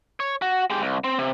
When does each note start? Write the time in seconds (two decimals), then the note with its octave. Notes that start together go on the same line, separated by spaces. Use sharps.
0.20 C#5
0.42 F#4
0.70 G#3 G4
0.82 C2
1.04 C4
1.19 C3